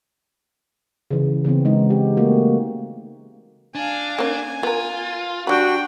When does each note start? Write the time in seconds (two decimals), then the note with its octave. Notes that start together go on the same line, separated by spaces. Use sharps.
1.11 C#3 E3
1.45 C#3 E3 B3 C4
1.65 G#3 D#4
1.90 G4
2.17 A3 A#3 F#4
3.75 D4 F5 G#5
4.18 A#3 C#4 G#5
4.63 B3 F4 A#4
5.47 G3 D4 F#4 G5 B5